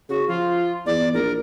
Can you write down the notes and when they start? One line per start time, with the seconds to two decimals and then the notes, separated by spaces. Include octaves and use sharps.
0.09 C#3 F#4
0.28 F3 F4
0.86 E2 D5
1.14 A#1 A#4